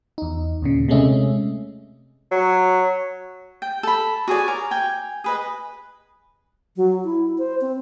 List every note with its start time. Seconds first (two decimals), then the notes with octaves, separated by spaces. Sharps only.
0.18 E2 D#4
0.62 D#2 A#2 C#3
0.88 C3 G#3 A3 C#4 D#5 E5
2.31 F#3
3.62 G5
3.83 A4 B5
4.28 F#4 G#4 C#5 D5
4.48 A#4
4.71 G5 G#5
5.24 G#4 B4 D#5
6.76 F#3
7.04 E4
7.38 C5
7.61 C4